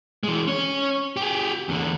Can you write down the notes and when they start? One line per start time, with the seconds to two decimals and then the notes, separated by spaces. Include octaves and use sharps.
0.23 E3 G#3
0.47 C#4 C#5
1.16 G4 G#4
1.69 E2 D3